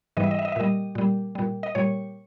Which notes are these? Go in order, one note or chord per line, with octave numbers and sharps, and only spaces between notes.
G#2 E3 G3 D#5
E5
D#5
E5
D#5
E5
A#2 G3 D#5
A#2 G3
A#2 G3
D#5
A#2 G3 C#5